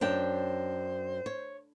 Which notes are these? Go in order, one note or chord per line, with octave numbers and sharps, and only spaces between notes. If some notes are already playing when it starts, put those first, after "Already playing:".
F#2 D4 C5 G5
C#5